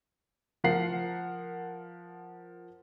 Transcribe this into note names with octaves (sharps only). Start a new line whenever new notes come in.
F3 A#4 F#5 C7